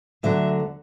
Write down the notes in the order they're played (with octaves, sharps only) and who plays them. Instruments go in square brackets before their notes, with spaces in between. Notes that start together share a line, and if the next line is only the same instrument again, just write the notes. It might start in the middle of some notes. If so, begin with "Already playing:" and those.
[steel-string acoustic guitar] D2 D3 F#3 E5